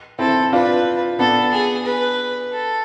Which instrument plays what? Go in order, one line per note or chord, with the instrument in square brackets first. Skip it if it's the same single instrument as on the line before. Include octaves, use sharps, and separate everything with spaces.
[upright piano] C4 E4 [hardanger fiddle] A4
[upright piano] D4 F4 [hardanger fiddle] B4
[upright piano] B3 D4 [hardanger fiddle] A4
[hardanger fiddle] G#4
B4
A4